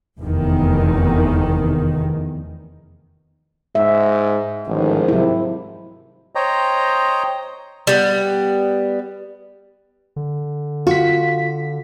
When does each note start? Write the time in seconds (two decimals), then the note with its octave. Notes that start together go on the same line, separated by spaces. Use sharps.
0.19 F1 E2 D#3
3.75 G#2 E5
4.67 A1 G#2 D#3 F3
5.08 C3 F#3 E4
6.35 C5 C#5 D#5 G5 A#5
7.87 G3 B3
10.16 D3
10.87 F4 F#4 B6